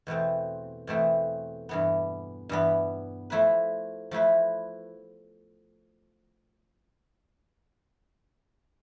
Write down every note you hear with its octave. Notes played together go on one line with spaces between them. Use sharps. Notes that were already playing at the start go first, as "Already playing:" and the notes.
E2 B2 A3 C4
E2 B2 A3 C4
G2 E3 B3
G2 E3 B3
F3 A3 E4 B4
F3 A3 E4 B4